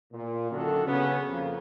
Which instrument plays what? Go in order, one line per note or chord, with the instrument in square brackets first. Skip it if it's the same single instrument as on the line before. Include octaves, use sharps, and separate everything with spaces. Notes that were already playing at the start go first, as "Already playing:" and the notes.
[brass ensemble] A#2
F#2 D3 D#3 D4 F#4 A4
C#3 B3 C#4
F2 A#3